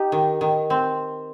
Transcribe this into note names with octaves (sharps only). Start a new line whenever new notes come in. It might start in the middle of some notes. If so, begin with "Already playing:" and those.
Already playing: D#4 G4
D#3
D#3
C4